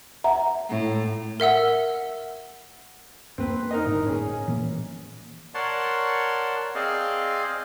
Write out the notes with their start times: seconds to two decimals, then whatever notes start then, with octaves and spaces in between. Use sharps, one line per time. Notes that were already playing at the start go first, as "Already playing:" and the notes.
0.24 E5 F#5 A#5
0.69 A2
1.40 A#4 E5 F#5 E6
3.38 F2 A#3 C4 B4
3.71 D#4 A#4 D#5
3.84 G1 A2
4.06 C#4 G#4
4.48 A#2 E3 A#3
5.54 A#4 C#5 D5 F#5 A5 C6
6.75 C4 G#4 C5 D5 D#5 F5